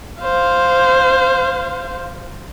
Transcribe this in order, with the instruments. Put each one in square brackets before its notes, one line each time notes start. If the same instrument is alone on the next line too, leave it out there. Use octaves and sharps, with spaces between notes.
[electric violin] C5 F5